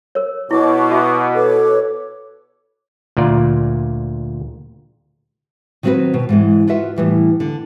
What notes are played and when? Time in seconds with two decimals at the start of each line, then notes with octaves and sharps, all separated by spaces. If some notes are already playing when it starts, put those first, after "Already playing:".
0.15 A#4 C#5
0.51 B2 E4 C#5 C#6 D6
0.90 F#4 E5 D#6
1.35 A4 B4 C#5 D6
3.17 D2 A#2 F4 D5
5.83 D#3 F#3 C4 E4 F#4 B4
6.14 B2
6.29 G#2 E3 G#3
6.68 F4 F#4 B4 E5 F#5
6.96 A2 E3 G3
7.40 D3